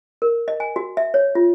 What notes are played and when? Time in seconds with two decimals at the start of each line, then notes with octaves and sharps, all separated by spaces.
0.22 A#4
0.48 D#5
0.60 G#5
0.76 F#4
0.97 E5
1.14 C#5
1.35 F4